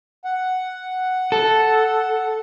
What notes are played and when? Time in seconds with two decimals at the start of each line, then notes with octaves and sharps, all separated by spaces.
0.25 F#5
1.32 A4